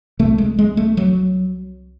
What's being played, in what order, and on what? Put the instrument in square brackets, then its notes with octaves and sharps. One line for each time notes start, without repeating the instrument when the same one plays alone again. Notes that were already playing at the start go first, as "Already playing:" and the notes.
[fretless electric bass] C3 A3
C2
G#3
G#3
A3
F#3